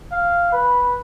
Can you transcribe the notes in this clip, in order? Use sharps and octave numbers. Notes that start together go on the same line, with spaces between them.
F5
B4